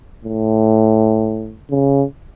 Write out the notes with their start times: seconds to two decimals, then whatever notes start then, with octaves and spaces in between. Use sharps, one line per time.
0.25 A2
1.71 C#3